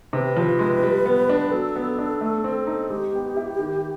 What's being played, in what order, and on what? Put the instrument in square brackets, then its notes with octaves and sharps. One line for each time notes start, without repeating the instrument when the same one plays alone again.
[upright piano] C3 [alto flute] B4
[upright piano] F3
G#3
G3
B3
D4
[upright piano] F#3 [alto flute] A4
[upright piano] B3
D4
A3
C4
D#4
[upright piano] G#3 [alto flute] G4
[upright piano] B3
E4
D#3